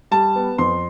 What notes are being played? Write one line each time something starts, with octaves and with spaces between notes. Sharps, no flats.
G3 A5
B3
F2 C6